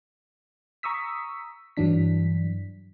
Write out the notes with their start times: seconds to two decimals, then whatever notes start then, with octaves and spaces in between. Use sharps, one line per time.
0.83 A#5 C#6 D#6 E6 B6
1.77 G2 E3 F#3 D4 B6